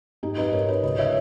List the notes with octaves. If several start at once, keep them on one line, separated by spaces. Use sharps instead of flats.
G#2 D#4 G4
B4 D#5
G#2 A#4 C#5
B4 D#5
C#2 B4 D#5
C#5 E5